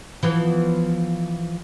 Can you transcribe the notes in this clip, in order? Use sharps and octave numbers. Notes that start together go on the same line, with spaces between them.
E3 F3 B3